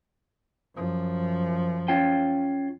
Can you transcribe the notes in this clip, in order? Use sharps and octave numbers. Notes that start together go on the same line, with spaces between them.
F#2 F3
C#4 F4 G5